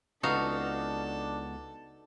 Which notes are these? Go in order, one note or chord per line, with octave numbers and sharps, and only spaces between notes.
C#2 B3 D4 D#4 F#4 A4 F5